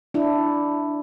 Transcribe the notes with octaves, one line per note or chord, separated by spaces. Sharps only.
D4 E4